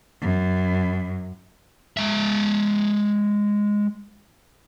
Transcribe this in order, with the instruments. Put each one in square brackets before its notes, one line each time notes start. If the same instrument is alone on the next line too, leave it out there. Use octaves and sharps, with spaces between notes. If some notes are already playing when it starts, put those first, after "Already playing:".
[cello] F#2
[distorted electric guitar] G#3 E5